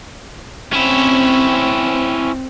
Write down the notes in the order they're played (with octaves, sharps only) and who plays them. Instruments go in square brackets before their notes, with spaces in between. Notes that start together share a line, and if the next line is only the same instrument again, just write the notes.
[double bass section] C4 [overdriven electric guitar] C#4 E4